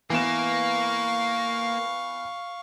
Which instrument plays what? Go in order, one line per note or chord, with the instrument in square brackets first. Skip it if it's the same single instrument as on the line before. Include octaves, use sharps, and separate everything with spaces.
[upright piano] E3 B3 E7 [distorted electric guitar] A#3 [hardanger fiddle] F5 C#6